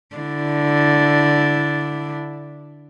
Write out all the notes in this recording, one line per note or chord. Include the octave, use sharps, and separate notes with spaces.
D3 D4 E4